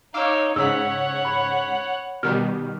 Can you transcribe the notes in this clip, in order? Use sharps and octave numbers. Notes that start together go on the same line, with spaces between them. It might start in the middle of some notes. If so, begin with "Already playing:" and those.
D#4 C#5 F5 D6 E6
G#2 C#3 C#5 F#5 E6 B6
B5
B2 D#3 G3 F6